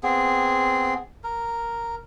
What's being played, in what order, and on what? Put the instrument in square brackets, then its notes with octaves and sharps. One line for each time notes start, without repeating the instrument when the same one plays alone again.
[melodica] B3 C4 G#4
A#4